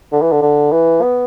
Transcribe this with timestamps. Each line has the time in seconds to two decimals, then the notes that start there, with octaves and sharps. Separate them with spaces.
0.12 D3
0.22 E3
0.32 D3
0.42 D3
0.72 E3
1.02 B3